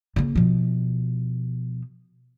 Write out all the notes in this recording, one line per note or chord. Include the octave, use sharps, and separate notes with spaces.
C#3 A#3
B2 F3